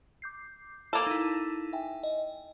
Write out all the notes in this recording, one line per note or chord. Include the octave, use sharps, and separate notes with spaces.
D6 G6 C7
A#3 A4
D#4 E4
E5 G5 G#5
D#5